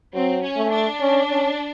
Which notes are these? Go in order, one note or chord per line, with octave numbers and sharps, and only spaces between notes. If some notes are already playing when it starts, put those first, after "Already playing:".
F#3 C4
C#4
A3
D4
C#4
C#4